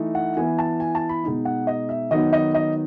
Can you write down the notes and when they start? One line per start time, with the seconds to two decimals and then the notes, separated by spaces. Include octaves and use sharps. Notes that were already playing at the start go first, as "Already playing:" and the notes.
Already playing: E3 A3 D#4
0.15 F#5
0.37 E3 B3 E4 G#5
0.59 A5
0.80 G#5
0.95 A5
1.09 B5
1.24 B2 G#3 D#4
1.45 F#5
1.67 D#5
1.89 E5
2.11 D#3 F#3 B3 D#4 D#5
2.33 D#5
2.54 D#5